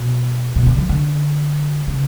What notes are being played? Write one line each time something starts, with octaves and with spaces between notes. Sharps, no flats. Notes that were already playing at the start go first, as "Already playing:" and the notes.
Already playing: B2
B2
D3
F3
D3
C#3